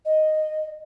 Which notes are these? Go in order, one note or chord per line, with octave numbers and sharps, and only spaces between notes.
D#5